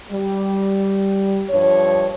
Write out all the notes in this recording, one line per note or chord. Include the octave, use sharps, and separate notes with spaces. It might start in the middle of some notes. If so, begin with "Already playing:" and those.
G3
G2 F3 C#5